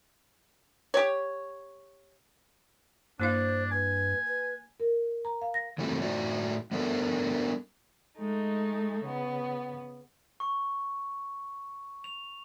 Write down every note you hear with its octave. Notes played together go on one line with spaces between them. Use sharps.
G4 C#5
G2 A#3 D4 E4 C5 F5
B4 G#5
B4
A#4
A#5
F5
A#6
C#3 E3 G3 A3 C4
A2 D#4 F#4 D5
G3 B3 D4 A4 A#4
G#3 A3 D#4
C#3 B3
C#6
F7